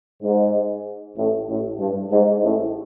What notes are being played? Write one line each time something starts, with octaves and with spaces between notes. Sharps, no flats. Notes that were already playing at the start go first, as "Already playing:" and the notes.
G#2
A1 A2
A1 A2
G2
G#2
A1 A2